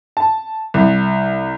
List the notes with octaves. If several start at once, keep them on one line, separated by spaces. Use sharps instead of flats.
A5
C2